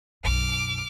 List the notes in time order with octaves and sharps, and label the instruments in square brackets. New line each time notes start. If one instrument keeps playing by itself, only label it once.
[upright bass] B1 F#2 [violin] D6 F6